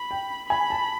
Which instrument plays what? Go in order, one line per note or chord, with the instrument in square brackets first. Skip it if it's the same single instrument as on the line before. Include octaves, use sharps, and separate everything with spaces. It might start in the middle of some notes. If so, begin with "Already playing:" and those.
Already playing: [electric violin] B5
[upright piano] G5
[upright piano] G#5 [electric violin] B5
[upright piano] A5